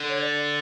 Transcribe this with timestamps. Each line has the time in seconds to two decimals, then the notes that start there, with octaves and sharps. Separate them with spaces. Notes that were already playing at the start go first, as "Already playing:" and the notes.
Already playing: D3
0.09 C#5
0.19 D5